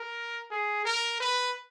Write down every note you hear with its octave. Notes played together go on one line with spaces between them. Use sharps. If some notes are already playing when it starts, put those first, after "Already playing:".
Already playing: A#4
G#4
A#4
B4